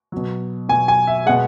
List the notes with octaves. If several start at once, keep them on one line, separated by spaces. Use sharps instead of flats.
B2 F#3
B2 F#3 G#5
G#5
E5
B2 G#3 F#5